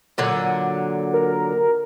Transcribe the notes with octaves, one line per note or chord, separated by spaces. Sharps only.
A#2 D3 F#3
A#4